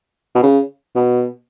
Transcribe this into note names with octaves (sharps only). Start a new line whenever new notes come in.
B2
C#3
B2